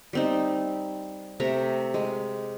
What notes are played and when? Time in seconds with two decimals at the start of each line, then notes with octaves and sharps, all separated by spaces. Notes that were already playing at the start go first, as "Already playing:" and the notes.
0.13 G3 C4 D#4
1.40 C3 A3 E5 A#5
1.94 G#3